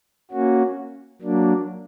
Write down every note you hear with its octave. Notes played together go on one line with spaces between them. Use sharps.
A#3 C#4 F#4
F#3 A#3 D4